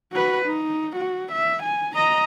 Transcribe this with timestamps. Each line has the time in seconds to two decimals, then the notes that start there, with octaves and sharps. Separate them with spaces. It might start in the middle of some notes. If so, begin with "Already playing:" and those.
0.12 F#4 B4
0.45 D#4
0.96 F#4
1.32 E5
1.63 G#5
1.95 D#5 A#5